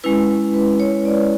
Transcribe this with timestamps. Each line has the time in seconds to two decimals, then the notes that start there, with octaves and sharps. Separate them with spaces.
0.04 G#3 C#4 E4 B4
0.54 B4
0.80 C#5
1.05 D5